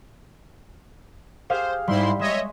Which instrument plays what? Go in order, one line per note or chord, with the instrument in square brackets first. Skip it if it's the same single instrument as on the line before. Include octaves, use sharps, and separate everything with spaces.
[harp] G4 G#4 F5 [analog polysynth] C5
[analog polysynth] G#2 E4 C6 [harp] G3
[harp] G#3 [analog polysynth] C#5 D#5 E5